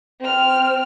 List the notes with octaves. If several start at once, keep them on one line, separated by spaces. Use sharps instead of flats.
C4 F6